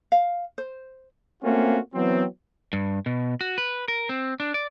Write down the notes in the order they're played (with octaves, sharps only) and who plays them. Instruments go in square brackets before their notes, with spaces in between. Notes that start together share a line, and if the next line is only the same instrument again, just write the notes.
[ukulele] F5
C5
[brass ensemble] A3 A#3 C4 C#4 F4 F#4
E3 F#3 B3 C4
[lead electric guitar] G2
B2
F#4
B4
A#4
C4
D4
D5